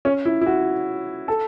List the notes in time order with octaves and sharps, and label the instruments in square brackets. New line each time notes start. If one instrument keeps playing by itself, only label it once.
[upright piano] C#4
E4
E4
F#4
A4